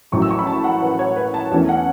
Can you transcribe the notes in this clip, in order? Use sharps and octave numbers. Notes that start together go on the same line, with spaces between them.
A1 A2 F#3 C#6
E6
C#6
B5
A5
F#5
B4
C#5
B4
A5
E2 E3 A3 C#4 A5
F#5